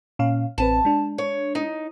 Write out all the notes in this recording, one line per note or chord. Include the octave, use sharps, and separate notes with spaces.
A#2 C#4 F5
A1 C4 B4 A5
G#3 D4
C#5
D#4